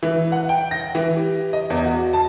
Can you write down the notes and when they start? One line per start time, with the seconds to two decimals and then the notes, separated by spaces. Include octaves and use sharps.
0.03 E3
0.32 F#5
0.49 G5
0.71 A#6
0.95 E3
1.16 G4
1.53 D#5
1.70 E2
1.85 F#4
2.13 A5